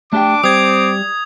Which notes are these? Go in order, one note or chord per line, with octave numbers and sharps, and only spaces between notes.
A3 D4 G4 G5 D6
G3 C4 D#6 G#6